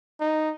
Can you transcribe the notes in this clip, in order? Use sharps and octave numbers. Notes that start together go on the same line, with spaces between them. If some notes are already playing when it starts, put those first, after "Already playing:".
D#4